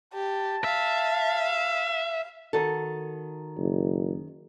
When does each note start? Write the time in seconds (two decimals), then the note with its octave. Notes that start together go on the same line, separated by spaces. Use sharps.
0.13 G4 A5
0.64 E5 F5
2.53 D#3 F#4 A4
3.57 F#1